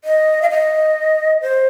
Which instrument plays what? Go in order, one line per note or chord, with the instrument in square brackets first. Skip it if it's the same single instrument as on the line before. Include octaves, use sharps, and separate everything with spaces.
[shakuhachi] D#5
F5
D#5
C5